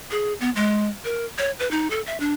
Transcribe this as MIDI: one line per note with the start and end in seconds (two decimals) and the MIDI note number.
0.11 0.33 68
0.40 0.50 59
0.56 0.89 56
1.05 1.25 70
1.38 1.51 73
1.59 1.70 71
1.71 1.90 63
1.90 2.01 69
2.06 2.19 76
2.20 2.34 62